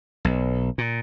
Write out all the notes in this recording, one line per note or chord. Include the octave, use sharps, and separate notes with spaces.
B1
A#2